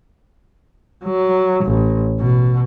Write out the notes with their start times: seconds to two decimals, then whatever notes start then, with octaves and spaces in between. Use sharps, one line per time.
1.05 F#3
1.65 A1
2.20 B2